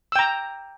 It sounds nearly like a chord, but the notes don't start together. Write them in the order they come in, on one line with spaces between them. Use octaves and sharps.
E6 G5 A#5